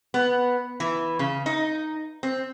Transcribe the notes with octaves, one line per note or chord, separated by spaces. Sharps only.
B3
E3
C#3
D#4
C4